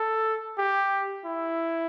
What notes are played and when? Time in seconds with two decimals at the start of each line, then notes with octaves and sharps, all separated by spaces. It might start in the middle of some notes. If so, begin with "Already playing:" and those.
Already playing: A4
0.58 G4
1.25 E4